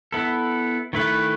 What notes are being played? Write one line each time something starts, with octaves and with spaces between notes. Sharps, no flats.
B3 E4 A4
D#3 A3 E4 B4